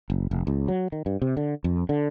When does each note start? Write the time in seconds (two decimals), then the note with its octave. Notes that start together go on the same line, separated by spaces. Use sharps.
0.10 F#1
0.31 F1
0.47 C#2
0.68 F#3
0.92 D#3
1.06 G2
1.22 C3
1.37 D3
1.64 F2
1.89 D3